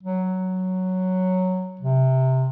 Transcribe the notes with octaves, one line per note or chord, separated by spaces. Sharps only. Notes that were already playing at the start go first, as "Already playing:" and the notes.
F#3
C3